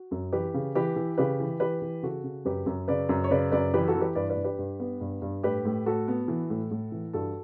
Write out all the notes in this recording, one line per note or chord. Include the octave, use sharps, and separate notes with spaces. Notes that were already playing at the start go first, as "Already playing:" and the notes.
Already playing: F#4
F#2
E3 G4 B4
C#3
E3 G4 B4
E3
C#3 G4 B4
E3
E3 G4 B4
E3
C#3 F#4 A4
C#3
F#2 G4 B4
F#2
C#3 B4 D5
F#2
C#5
C#3 B4 D5
F#2 B4 D5
E3 G4 B4
F#4 A4
E3
G4 B4
G2 B4 D5
B4 D5
G2
G4 B4
G2
B3
G2
G2
A2 G4 B4
A2
A2 F#4 A4
B3
E3
A2
A2
E3
G2 F#4 A4